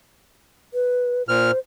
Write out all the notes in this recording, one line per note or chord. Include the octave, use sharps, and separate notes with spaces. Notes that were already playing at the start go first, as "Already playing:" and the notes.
B4
A#2 C5 F6